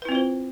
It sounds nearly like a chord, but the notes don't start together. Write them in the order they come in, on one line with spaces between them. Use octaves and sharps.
B4 E4 C4 F4 C5